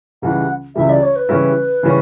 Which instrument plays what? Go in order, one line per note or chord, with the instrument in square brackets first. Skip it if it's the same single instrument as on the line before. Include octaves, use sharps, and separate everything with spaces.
[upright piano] C#2 C#3 E3 G3 [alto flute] F#5
[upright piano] C#2 C#3 E3 G3 [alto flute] E5
[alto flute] D5
C#5
B4
[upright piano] C#3 E3 G3 C#4 E4
C#3 E3 G3 C#4